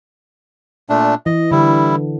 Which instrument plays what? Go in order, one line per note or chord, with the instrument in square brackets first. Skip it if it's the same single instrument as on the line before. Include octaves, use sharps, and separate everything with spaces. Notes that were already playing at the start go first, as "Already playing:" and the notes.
[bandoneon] A#2 A3 D4
[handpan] E3 [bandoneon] D#5
[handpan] D3 [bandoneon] G3 E4